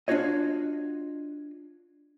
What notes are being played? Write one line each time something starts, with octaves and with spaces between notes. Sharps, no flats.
D4 F4 F#4 C#5 D#5